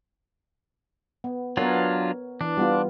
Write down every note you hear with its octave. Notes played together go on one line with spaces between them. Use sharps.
B3
F#3 B3 D4 F4 A#4 C#5
E3 D4
G3 B3 F4